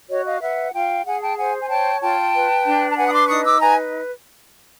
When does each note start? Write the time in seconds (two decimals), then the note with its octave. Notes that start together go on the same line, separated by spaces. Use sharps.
0.10 F#4 C#5 D#5
0.26 D#5 F5
0.41 B4 E5 F#5
0.73 F4 F5 G5
1.06 G#4 F#5 G#5
1.21 G5 A5
1.37 C5 F#5 G#5
1.60 G#5
1.69 C#5 G5 A5
2.01 F4 G5 A5
2.34 B4
2.65 D4
2.89 A5
2.97 B4 F#5 G#5
3.08 D#6
3.13 C6 D6
3.28 D#4 C#6 D#6
3.44 D6 E6
3.60 B4 G#5 A#5